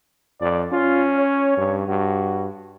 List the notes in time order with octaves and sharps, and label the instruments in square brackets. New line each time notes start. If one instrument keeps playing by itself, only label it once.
[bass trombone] F2 [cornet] D5
[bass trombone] C#4 [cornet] F4
[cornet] C#5
[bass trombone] G2
[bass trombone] G2 [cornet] F#4